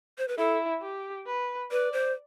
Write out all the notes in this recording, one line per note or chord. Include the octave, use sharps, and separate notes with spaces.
C5
B4
E4 A4
G4
B4
B4 D5
C5